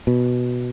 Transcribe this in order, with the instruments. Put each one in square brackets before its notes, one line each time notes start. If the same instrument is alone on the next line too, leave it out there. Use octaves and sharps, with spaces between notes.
[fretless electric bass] B2